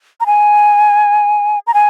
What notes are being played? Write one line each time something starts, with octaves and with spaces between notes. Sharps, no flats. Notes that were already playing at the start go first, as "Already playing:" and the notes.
A#5
G#5
A#5
G#5